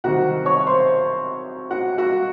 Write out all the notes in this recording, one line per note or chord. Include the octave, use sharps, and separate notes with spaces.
C2 C3 D#3 F#3 F#4 F#5
C#5 C#6
C5 C6
F#4 F#5
F#4 F#5